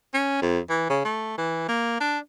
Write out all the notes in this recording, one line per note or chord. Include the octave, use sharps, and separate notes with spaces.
C#4
F2
E3
C#3
A3
E3
A#3
D4